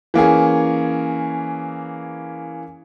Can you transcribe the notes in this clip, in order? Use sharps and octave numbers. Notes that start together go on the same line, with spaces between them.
E3 A#3 C#4 G#4